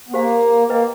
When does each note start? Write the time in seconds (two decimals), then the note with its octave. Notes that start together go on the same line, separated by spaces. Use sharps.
0.08 B3
0.13 A#3 G4 C5 F5 G#5
0.69 A#3 B4 D#5 G5